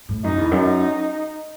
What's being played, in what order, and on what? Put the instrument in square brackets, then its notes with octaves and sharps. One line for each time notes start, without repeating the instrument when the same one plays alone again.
[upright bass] A2
[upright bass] F#2 [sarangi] D#4
[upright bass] E2
[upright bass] F#2 [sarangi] D#4